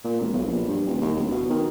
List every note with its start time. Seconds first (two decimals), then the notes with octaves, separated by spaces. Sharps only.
0.04 A#2
0.21 E1
0.34 B1
0.46 A#1
0.68 G2
0.86 D#1
1.02 D#2
1.17 D1
1.31 B2
1.50 D#3